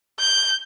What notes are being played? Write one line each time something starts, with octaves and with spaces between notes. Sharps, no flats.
G6